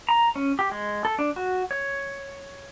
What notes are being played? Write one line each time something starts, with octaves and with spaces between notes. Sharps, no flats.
A#5
C#4
G4
G#3
A4
D4
F#4
C#5